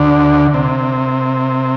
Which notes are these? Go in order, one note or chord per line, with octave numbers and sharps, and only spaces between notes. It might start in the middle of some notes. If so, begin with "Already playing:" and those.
Already playing: D2 D3
C3